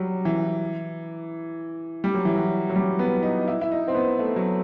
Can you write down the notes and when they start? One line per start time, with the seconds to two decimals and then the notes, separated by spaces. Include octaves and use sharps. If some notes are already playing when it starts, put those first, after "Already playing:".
Already playing: F#3 G3
0.25 E3
2.04 G3
2.15 F#3
2.25 E3
2.35 F#3
2.69 F#3
2.76 G3
2.99 B3
3.23 D#4
3.48 E4
3.61 E4
3.71 D#4
3.88 C4
3.95 B3
4.19 A3
4.36 F#3